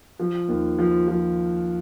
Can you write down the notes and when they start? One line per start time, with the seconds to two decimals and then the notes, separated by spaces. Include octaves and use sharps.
0.19 F3
0.48 D#2
0.79 F3
1.08 F3